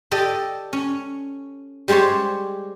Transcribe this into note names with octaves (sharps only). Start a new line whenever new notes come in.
G4 A4 D5 D#5
C#4
G3 G#3 G4 C5 C#5